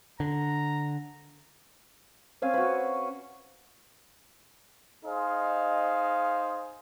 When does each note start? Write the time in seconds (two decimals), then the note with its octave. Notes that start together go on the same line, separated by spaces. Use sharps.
0.20 D3 A#5
2.42 C4 C#4 F5 G#5
2.54 F#4 B4
5.04 D#4 G#4 C5 D#5 F5